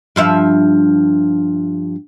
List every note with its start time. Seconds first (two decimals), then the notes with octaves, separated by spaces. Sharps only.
0.16 G2 F3 E5